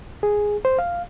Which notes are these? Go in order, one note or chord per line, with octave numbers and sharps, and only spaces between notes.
G#4
C5
F5